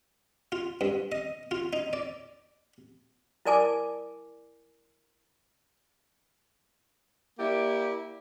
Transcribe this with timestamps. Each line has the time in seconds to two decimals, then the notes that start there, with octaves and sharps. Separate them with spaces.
0.52 F4
0.81 G2
1.12 D#5
1.51 F4
1.73 D#4
1.93 D5
3.45 E4 A#4 D5 G#5 A5 D6
7.39 A#3 E4 G4 D5